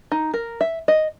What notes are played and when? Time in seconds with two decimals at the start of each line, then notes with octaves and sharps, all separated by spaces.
0.12 D#4
0.34 A#4
0.61 E5
0.88 D#5